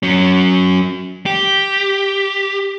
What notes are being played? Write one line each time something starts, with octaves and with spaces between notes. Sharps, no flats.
F#3 C#4
G4